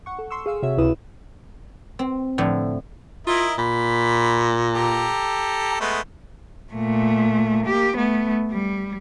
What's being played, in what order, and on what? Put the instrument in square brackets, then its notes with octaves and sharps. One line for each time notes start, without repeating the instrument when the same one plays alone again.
[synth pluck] F#5 C#6
A4
C6 C#6 E6
G#4 F5 E6
C3 F#4 C#5 E5 E6
C#2 C3 E4 B4 D#6 E7
[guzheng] C4
A2 D3 F3 E5
[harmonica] E4 A#4 D#5 [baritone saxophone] F4
[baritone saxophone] A#2 [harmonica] B5
[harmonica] G4 A4 A#5
G#3 A3 B3
[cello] A#2 A3
A#3 G4
A3 B3
G3